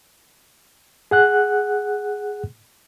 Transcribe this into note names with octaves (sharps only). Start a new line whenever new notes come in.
G#4 F#5 F#6